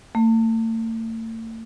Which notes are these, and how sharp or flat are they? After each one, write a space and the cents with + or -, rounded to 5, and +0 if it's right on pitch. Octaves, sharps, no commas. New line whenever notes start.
A3 +40